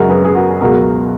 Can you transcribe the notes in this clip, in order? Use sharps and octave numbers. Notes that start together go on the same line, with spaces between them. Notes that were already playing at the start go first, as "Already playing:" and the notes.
Already playing: F#2 C#3 G#3 F#4 A#4
G#4 B4
G#4
F#4 A#4
C#2 B2 F#3 F#4 A#4